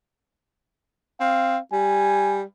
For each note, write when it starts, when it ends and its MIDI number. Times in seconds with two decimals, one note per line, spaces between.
1.20 1.57 60
1.20 1.59 77
1.73 2.43 55
1.73 2.40 80